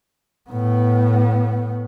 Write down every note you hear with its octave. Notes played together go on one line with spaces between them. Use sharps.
A2 B3